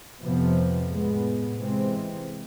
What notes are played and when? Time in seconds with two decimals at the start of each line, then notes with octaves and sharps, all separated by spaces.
0.23 F2 C3 F3 B3
0.91 A2 G#3 B3
1.58 C3 E3 G#3 C4